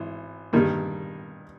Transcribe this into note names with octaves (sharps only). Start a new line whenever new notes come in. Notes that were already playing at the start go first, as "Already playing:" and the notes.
Already playing: G#1 E3
G2 D#3 G3 A#3 D#4